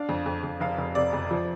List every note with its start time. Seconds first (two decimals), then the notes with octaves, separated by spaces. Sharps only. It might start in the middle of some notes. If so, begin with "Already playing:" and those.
Already playing: D4 F5
0.09 F2
0.26 F2
0.44 F2
0.60 F1 F5
0.78 F1
0.95 C3 D5
1.13 F2
1.31 F3